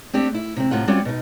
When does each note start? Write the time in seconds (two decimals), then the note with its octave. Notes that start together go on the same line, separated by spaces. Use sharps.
0.13 A3 C4 D4 G4
0.35 E4
0.57 C3 C4
0.71 A2 C3 F4 F#5
0.88 G3 C4 C#4 F4 F#4 D5
1.05 B2 D#4